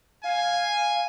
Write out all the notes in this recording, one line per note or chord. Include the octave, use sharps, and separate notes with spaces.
F5 G#5